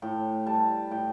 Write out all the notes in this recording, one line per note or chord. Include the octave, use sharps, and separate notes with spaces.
A2 G5
G3 A5
A2 G5